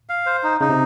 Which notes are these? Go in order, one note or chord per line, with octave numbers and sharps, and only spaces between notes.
F5
C5
D#4
C#3 D#4
C3